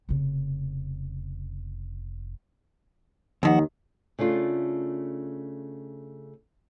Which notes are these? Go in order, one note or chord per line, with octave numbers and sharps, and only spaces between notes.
F1 C#3
D#2 D#3 F3 F#5
C#3 A3 D4 F4